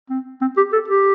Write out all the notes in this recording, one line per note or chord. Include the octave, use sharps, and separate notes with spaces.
C4
C4
G4
A4
G4